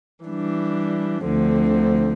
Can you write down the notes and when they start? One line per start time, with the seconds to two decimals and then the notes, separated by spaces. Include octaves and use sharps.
0.25 E3 G3 D4
1.25 D2 D3 F3 C4